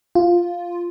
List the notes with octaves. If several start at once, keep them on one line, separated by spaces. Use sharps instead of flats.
F4